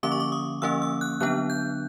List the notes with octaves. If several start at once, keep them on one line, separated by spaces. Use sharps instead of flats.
D3 F3 A#3 C#4 D6
C#6
D6
D#6
D3 F3 A#3 C#4 E6
E6
F#6
D3 F#3 B3 D4 F#6
G6